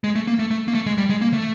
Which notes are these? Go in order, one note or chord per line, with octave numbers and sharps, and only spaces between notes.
G#3
A3
A#3
A3
A3
A#3
A3
G#3
G3
G#3
A#3
A3